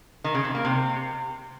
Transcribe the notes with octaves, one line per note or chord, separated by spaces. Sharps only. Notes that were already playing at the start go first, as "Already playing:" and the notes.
D#3
C#3
C3
A#3
C3